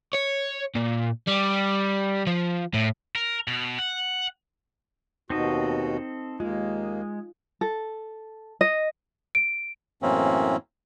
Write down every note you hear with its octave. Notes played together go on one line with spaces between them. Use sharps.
C#5
A#2
G3
F3
A2
A#4
B2
F#5
D#2 B2 C4 D#4 F#4 A4 D#5
D#2 G#3 A#3 F4
A4
D#5
D7
F#2 A2 E3 A#3 C4 C#4